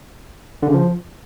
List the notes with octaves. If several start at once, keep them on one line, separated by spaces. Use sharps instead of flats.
D3
C#3
F3